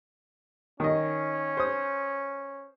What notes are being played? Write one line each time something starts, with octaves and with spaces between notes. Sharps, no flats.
D#3 C#4 D#5
C5 D#6